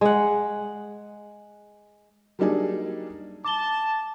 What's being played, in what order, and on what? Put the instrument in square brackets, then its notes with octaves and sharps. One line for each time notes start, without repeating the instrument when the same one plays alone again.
[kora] G#3 F#5
[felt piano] F#3 G3 A#3 D4 D#4 G#4
[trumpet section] A5 [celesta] D6 G7